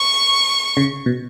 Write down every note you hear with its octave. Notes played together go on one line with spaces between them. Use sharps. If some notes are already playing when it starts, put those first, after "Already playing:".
Already playing: C#6
C#3
B2